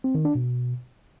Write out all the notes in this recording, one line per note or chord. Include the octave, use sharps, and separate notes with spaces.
C4
D#3
D4
B2